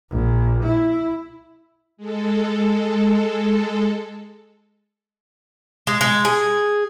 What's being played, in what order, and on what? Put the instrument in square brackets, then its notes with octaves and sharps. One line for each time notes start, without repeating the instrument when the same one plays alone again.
[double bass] A#1
E4
[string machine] G#3 A4
[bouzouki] G#3
G#3
G#4